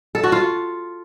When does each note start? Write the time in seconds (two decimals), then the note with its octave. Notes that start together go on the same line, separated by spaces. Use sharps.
0.15 A4
0.23 F#4
0.32 F4